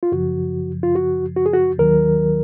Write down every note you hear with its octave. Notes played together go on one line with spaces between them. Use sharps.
F4
F#2 C#3 F3 F#4
F4
F#4
F#4
G#4
F#4
D#2 D#3 F#3 A#4